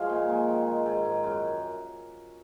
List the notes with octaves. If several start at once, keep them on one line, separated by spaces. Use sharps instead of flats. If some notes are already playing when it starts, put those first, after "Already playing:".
Already playing: F3 G#3 C#5 F5
A#2
G#3
D#3
G#3
G#2
G#2
F#2